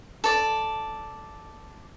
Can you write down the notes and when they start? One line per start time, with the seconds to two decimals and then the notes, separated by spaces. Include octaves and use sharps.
0.24 A4 D5